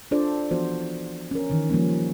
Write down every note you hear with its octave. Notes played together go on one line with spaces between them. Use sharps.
D4 F4 A4 C5 D5
E3 F3 B3 F#4 C5
C#4 A#4
D#3 E3
F3 G3 A#3 C#4